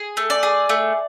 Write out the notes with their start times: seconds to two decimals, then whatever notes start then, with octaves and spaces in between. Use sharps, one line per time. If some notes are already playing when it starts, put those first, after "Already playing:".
Already playing: G#4
0.17 A3
0.30 D5
0.43 G#4
0.69 A3